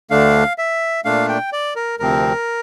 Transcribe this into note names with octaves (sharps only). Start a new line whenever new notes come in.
D2 D3 A3 D4 F5
E5
A#2 A3 D4 F5
G5
D5
A#4
D2 C3 F3 C4 A#4